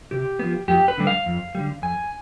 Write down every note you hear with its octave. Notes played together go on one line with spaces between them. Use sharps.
C3 G4
F3 B3
F2 G4
B4
D3 G3
F5
F2
D3 G3
F2 G#5